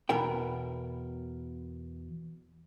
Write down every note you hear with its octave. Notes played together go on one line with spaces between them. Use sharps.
E2 B2 B3 A#4 G5